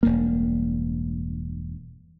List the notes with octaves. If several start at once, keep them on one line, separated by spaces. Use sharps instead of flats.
E1 G2 A#3